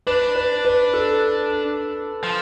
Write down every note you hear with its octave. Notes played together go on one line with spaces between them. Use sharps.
D4 B4
B4
B4
A4
F3